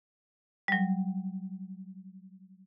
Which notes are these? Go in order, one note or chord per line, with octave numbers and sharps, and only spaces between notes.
F#3 G3